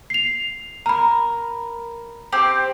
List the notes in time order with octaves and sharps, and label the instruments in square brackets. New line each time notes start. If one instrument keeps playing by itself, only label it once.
[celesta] C7 F7
[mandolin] A#4 [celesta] A#5 B5
[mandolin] C4 G4 C5